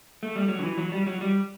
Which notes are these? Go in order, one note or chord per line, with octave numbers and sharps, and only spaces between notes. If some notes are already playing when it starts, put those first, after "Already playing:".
A3
G3
F#3
D3
E3
F#3
G3
F#3
G3